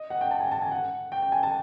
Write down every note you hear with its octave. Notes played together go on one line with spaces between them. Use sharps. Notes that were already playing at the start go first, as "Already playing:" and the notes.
Already playing: D#5
F#5
G5
A5
G#5
A5
G#5
F#5
G5
G5
G#5
A5